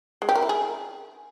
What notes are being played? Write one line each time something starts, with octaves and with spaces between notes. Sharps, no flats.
G#3
G4
A#4
E4
G#4